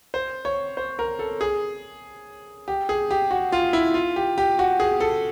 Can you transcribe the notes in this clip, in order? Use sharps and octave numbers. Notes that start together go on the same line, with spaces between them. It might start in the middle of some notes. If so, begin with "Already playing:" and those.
C5
C#5
C5
A#4
A4
G#4
G4
G#4
G4
F#4
F4
E4
F4
G4
G4
F#4
G#4
A4